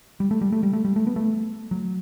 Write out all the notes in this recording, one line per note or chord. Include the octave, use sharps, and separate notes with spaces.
G3
A3
G3
A3
G3
A3
G3
A3
B3
A3
F#3